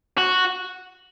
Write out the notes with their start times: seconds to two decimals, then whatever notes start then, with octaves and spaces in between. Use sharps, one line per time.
0.18 F#4